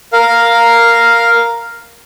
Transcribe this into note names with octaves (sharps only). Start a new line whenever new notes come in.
A#4 F5